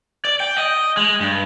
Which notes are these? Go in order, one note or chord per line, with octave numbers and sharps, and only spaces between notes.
D5
G5
D#5
G#3
G2